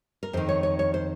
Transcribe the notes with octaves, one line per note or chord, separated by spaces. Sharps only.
A#4
F2 D#3 C5
C#5
C#5
C#5
C5